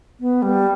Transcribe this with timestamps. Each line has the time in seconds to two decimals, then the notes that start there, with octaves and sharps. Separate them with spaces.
0.20 B3
0.42 G3